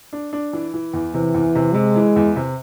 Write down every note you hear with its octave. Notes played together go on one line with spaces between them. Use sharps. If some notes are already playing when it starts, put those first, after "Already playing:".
D4
D4
E3
E3
E2
C3 E3
E2
C3
C3 G#3
E3
E2
C3